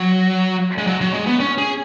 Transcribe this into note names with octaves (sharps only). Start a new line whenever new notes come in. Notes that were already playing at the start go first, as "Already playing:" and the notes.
Already playing: F#3
G#3
F#3
F#3
G#3
B3
C#4
G#4